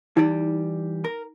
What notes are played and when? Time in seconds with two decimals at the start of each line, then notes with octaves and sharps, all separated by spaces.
0.17 E3 G3 D#4 D5
1.05 A#4